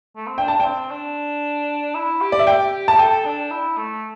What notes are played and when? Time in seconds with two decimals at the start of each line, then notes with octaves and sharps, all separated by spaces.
0.16 A3
0.27 C4
0.38 D4 G5
0.48 A5
0.56 D4
0.60 C4 G5
0.90 D4
1.95 E4
2.21 G4
2.32 D5
2.39 E5
2.47 G5
2.88 A5
2.94 G4
2.99 A4 G5
3.25 D4
3.51 E4
3.77 A3